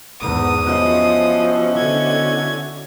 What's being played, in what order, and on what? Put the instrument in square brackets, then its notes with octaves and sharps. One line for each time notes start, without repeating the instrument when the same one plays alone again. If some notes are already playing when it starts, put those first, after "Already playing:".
[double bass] E2 G#2 [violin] D#6
[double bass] F3 [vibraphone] B3 C5 D#5 [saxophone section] C#4 E4 F#4
[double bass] D3 [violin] G#6